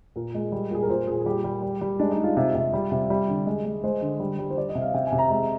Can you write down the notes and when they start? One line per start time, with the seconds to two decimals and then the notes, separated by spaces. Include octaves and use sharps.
0.16 A#2 A#4
0.35 G#3
0.52 G3
0.71 A#2 G#4
0.82 A#4
0.89 A#2 C5
1.07 A#2 G#4
1.21 G#4
1.26 G3 G4
1.44 G3
1.62 G3
1.81 G3
1.99 G#3 D4
2.11 D#4
2.18 G#3
2.24 F4
2.37 C3
2.55 C3
2.73 G3
2.92 C3
3.10 G3
3.28 D3
3.46 G#3
3.65 G#3
3.84 G#3 C5
4.01 D3
4.20 G3
4.39 G3
4.51 C5
4.57 G3 D5
4.69 D#5
4.75 C3
4.82 F5
4.94 C3 G5
5.07 G#5
5.12 C3
5.18 A#5
5.30 G#3 A#5